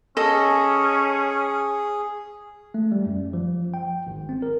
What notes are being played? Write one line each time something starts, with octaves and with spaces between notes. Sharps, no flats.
C#4 G#4 A4 D#5
A3
G3
F#2
F3
G5
G#1
C4
A#4